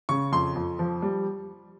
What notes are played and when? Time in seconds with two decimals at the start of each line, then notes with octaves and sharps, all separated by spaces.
0.09 C#3 C#6
0.32 F2 C6
0.56 F2
0.79 F3
1.02 G3